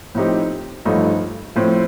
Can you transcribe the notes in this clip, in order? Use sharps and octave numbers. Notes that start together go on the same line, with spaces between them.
A2 F3 C4 D#4 G4
A1 G2 F3 A3 D#4
A2 F3 C4